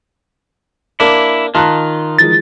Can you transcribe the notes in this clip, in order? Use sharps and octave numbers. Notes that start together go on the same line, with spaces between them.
A#3 D4 E4
D#3 F4 A5 A#5 F#6
E3 F3 G#3 A6